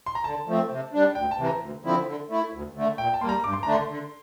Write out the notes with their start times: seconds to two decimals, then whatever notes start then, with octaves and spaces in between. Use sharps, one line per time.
0.06 C6
0.15 A#5
0.24 D3 A5
0.47 F3 A3 C4
0.71 C3
0.93 G3 D4
1.15 D2 G5
1.31 A5
1.38 C3 E3
1.46 A#5
1.61 D2
1.85 D3 F3 C4 E4
2.06 D3
2.30 A3 E4
2.53 D2
2.75 D3 A3
2.98 A#2 G5
3.14 A5
3.21 A#3 C6
3.24 G3 A#5
3.44 G2 D6
3.53 C6
3.63 D3 A3 D4 A#5
3.73 C6
3.89 D3